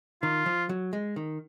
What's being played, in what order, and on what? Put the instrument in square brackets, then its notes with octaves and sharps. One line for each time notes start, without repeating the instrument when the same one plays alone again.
[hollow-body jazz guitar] D#3 [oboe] F4
[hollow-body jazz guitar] F3
F#3
G#3
D#3